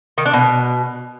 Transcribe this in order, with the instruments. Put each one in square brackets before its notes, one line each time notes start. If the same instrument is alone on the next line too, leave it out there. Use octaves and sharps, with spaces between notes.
[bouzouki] D#3
D4
B2